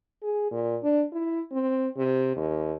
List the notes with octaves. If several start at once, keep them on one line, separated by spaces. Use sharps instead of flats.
G#4
A#2
D4
E4
C4
C3
D#2